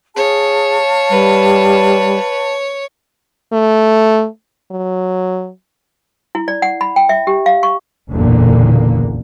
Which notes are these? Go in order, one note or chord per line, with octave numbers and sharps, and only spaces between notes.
G#4 C#5 F5 A5
G3 B4
A3
F#3
E4
D5
F#5
B5
G5
E5
G4
F5
C#6
F#1 B1 E2 A#2 D3 A#3